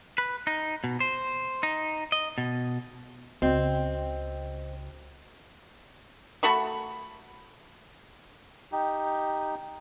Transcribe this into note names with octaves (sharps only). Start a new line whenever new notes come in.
B4
D#4
B2
C5
D#4
D#5
B2
C#2 C#3 C4 F#4 D#5 G5
A3 F#4 B5 C#6
D#4 G4